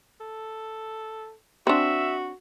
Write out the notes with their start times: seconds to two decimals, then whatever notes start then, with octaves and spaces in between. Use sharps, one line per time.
0.21 A4
1.67 C4 D4 F#4 E5